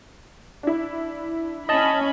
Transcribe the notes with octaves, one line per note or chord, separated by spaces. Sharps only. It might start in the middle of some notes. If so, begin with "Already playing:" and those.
D4 E4
C#4 D#5 A5 B5